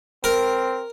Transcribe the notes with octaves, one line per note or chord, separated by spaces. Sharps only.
C4 A#4